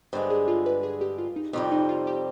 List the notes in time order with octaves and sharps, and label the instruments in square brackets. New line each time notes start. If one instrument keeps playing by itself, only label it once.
[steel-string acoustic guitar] G2 D3 G#3 [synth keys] C5
[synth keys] G#4
F4
B4
G#4
G4
F4
D#4
[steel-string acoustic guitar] F2 C3 G3 [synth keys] F4
[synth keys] D#4
F4
G4